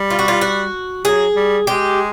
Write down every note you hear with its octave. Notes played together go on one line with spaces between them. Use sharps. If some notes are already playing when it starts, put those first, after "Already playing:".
Already playing: G3
F4
F#4
F4
F#4
F#3 G#4
G3
G#3 G4